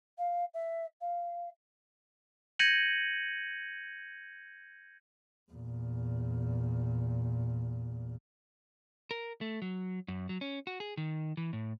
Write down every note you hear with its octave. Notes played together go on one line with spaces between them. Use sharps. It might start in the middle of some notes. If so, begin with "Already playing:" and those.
F5
E5
F5
G6 G#6 A#6 C#7 D#7 F#7
E2 A#2
A#4
A3
F#3
F#2
F#3
C#4
F#4
G#4
D#3
E3
A2